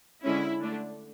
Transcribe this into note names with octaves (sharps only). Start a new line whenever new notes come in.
D3 G#3 C#4 E4
D3 A3 D4